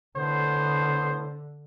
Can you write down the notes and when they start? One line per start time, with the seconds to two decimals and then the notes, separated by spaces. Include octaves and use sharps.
0.17 A2 D3 B3 C5